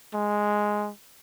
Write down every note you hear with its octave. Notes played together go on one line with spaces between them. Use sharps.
G#3